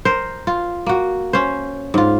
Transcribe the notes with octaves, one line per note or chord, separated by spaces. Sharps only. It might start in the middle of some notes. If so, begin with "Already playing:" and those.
A#4 C5
F4
A#3 F#4
C#4 C5
G#2 F4